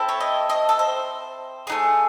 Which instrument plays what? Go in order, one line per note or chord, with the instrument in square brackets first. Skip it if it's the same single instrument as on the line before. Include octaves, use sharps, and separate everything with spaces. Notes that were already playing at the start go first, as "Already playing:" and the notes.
Already playing: [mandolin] C4 E4 A4
C#5
D#5
D#5
A4
C5
A3 D#4 G#4